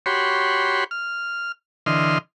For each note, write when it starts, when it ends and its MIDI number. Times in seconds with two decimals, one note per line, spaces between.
0.06 0.84 66
0.06 0.84 67
0.06 0.84 73
0.06 0.84 83
0.06 0.84 84
0.91 1.52 89
1.86 2.18 50
1.86 2.18 52
1.86 2.18 75
1.86 2.18 84
1.86 2.18 89